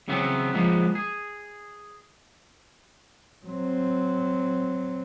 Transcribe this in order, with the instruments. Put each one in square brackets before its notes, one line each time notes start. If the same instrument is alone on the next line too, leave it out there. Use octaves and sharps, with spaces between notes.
[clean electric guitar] C#3 E3 F#3 B3 C4
F3 G#3 A#3 B3
G#4
[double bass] F#3 C4